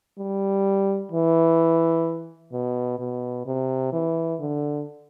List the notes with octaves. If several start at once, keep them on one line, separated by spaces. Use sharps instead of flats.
G3
E3
B2
B2
C3
E3
D3